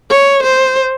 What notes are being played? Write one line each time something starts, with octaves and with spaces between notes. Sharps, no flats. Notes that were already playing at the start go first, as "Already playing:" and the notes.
C#5
C5